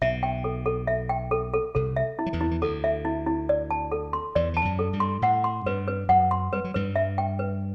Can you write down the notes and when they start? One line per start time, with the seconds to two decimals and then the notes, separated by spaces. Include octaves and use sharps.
0.01 B1 B2 E5
0.23 G5
0.44 A4
0.66 A4
0.87 E5
1.09 G5
1.31 A4
1.54 A4
1.75 C2 C3 A4
1.96 E5
2.19 E4
2.26 F#3
2.33 E2 E3
2.41 E4
2.51 E3
2.61 D2 D3 A4
2.84 E5
3.05 E4
3.27 E4
3.49 D5
3.71 A5
3.92 A4
4.13 C6
4.35 E2 E3 D5
4.54 E3 A5
4.65 F#2 F#3
4.79 A4
4.93 G2 G3
5.00 C6
5.22 A2 A3 F#5
5.44 C6
5.66 G2 G3 B4
5.88 B4
6.09 F#2 F#3 F#5
6.31 C6
6.53 G3 B4
6.64 F#3
6.74 G2 G3 B4
6.96 E5
7.18 G5
7.39 B4